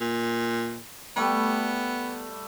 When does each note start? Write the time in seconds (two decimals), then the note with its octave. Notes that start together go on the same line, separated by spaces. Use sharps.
0.01 A#2
1.17 G3 A3 B3